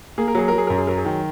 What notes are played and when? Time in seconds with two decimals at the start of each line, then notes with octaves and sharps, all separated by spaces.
0.18 A#3 G#4
0.28 A#4
0.35 F#3 G#4
0.48 F#3 A#4
0.58 G#4
0.67 F#2 A#4
0.77 G#4
0.87 F#3 A#4
0.97 G#4
1.05 D#3